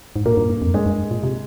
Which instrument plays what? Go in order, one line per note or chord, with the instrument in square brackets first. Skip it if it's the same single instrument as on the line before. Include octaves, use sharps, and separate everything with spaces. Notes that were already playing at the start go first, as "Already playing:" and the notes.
[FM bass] G#2
[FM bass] A#2 [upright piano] A#3
[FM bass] G2
G2
F2
[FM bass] G2 [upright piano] G#3
[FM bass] G2
A#2
C3